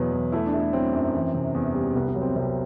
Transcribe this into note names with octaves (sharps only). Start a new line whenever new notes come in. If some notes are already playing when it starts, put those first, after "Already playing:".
Already playing: E2 B2 F#3 B4
E2
A3 E4
D4
A3
E4
F#3 C4
F#2
E3
C3
E2
G3
C2 B3
B3
F#3
C4
C2 C4